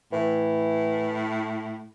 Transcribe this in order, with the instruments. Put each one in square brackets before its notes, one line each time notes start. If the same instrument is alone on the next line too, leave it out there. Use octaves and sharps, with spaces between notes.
[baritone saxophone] A2 [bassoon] E3